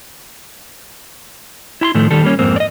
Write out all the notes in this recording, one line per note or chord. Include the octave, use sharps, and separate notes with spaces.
E4 B5 C6
A2 D#3 F3 A3
D#2 D#3 G3 A4
G3 A#3 C#4
F2 G#2 A#3 C4
D5 D#5